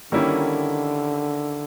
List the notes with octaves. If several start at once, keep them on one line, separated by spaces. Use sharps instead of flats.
D3 D#3 G3 A#3 C#4 E4